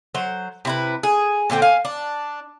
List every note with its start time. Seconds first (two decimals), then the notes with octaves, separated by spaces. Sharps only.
0.15 F#3 C5
0.65 C3 E4 B4
1.03 G#4
1.50 A#2 D3 C4 G5
1.62 F5 G#5
1.85 D4